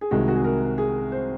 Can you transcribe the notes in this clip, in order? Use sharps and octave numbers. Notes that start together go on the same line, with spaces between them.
G#4
C2 C3 D#3 G#3 F#4
F#4
G#4
A#4
G#4
C5